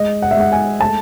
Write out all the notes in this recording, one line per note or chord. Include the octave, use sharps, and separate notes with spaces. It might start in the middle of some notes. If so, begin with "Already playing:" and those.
Already playing: G#3 D#5
F#5
E5
G#3 F#5
G#5
A3 A5